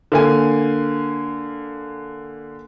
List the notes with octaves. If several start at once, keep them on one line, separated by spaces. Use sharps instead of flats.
D3 A#3 G#5